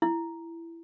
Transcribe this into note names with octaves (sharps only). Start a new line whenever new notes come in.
E4